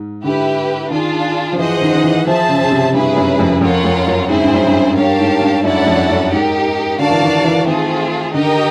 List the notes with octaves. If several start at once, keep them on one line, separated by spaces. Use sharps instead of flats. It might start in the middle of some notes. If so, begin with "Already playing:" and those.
Already playing: G#2
D3 E4 G4 B4
D#3 D4 F4 G#4
F3
E3 G#4 C5 D#5 F#5
D#3
D#3
E3
F3 G#4 C5 E5 A5
C#3
C#3
C3
G2 C#4 E4 G#4 B4
F#2
F2
F2 C#4 F4 A#4 C#5 F#5
F2
F#2
G#2 C4 E4 G#4 C5
G2
F#2
G2
G2 G4 A#4 C#5 F5 A5
G#2
G2
F#2 C#4 E4 A4 D5 F#5
F2
F#2
G#2 D#4 G4 A#4
D3 F#4 A#4 D5 F5 A5
E3
D#3
E3
D#3 A3 C4 F4 G#4
D3 D#4 G4 A#4 D#5 G5